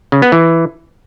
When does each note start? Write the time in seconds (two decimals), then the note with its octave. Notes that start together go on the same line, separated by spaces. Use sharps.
0.12 C#3
0.22 B3
0.32 E3